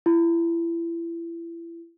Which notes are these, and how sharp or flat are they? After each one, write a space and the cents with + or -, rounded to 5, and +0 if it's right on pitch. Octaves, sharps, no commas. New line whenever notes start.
E4 +30